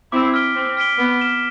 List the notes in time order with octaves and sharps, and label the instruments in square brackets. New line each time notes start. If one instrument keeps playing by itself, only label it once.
[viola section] C4 E4 [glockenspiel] D6
[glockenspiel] F6 B6 D7 G7
[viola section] C4 [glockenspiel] D6
[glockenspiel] F6 B6 D7 G7
[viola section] B3 [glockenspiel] D6
[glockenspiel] F6 B6 E7 G7